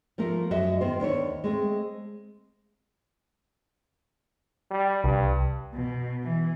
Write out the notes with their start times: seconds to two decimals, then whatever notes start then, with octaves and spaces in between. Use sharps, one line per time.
0.18 F3 A3 A#3 A#4
0.51 F#2 F#4 D#5 E5
0.81 D#3 B3 C5
1.00 D#2 D4 C5 C#5
1.44 G#3 A3 C4
4.71 G3
5.04 C2 G2
5.74 B2
6.23 E3